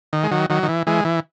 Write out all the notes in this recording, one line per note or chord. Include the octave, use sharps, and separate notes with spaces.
D#3
G#3
D#3 F#3
D#3 F#3
D#3
E3
E3 G#3
E3